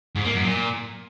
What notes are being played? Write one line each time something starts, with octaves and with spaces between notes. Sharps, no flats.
G#2
A#3
F#2
A#2